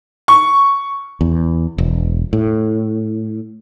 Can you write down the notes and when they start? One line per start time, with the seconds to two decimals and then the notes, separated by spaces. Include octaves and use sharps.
0.28 C#6
1.21 E2
1.78 E1
2.33 A2